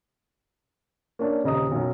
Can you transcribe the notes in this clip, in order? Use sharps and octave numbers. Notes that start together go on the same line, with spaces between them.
A#3 C#4 D4
D#1 C#3 D#5 A#5 D#6
B1 F#2